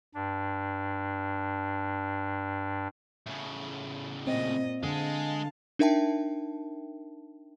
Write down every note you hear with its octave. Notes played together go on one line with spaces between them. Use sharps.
G2 D4
A2 C#3
A#2 C4 D#5
D3 G#3 G#4 F5 A5
D4 D#4 A#4 E5 G5 A5